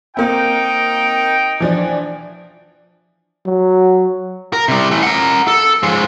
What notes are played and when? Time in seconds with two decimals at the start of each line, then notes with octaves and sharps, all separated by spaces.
0.17 A#3 C4 D#4 G5
1.60 E3 F3 D4
3.45 F#3
4.53 A#4
4.68 C3 G3
4.91 E3 A3
5.03 A#4 F#5
5.48 A4
5.83 F3 G#3